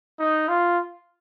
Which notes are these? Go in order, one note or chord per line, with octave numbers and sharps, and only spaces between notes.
D#4
F4